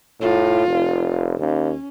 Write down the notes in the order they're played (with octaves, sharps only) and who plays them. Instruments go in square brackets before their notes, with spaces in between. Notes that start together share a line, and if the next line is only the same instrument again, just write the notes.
[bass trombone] A2 [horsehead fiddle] F4
[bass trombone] F1
[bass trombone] D#2 [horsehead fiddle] C#4